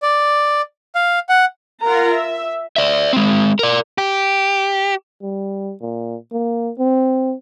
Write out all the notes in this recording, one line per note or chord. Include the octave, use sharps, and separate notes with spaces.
D5
F5
F#5
F4 A#4 F#5 A#5
E5
D5 E5
G#3 C4
A#4 D5
G4
G3
A#2
A#3
C4